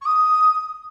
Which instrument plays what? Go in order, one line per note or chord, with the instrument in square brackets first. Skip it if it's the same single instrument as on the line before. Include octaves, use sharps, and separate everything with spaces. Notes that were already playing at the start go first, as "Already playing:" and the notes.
[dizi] C#6
D#6